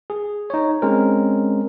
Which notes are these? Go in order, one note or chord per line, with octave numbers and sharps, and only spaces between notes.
G#4
D#4 C#5
G#3 C4 C#4 A#4